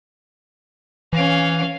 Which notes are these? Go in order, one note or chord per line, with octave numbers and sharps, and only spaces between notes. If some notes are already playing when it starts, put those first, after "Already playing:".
E3 C#4 F5